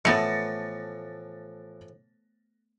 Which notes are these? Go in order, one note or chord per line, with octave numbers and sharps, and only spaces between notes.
A2 E3 F3 A3 B3 A6 A#6 C#7